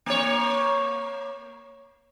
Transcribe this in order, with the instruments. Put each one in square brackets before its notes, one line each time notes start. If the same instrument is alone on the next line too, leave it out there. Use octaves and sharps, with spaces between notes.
[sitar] A#3 C#5